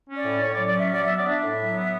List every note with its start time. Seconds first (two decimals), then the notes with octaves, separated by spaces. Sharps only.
0.08 C#4
0.17 D5
0.25 A2
0.42 A2 C#5
0.54 D5
0.59 F#3
0.67 D5
0.75 C#4 E5
0.92 F#3 D5
1.05 B3 E5
1.17 D5
1.26 D4 E5
1.43 A2
1.59 F#3
1.76 B3